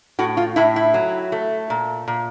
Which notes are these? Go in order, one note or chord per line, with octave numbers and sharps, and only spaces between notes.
A2 F#4
F4
A2 E4
E4
F#3
A3
A#2
A#2